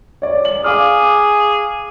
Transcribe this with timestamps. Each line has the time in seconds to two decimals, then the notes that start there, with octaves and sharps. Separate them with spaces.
0.22 C#5 D5
0.41 D5 F#7
0.64 G#4 F5 D6 F6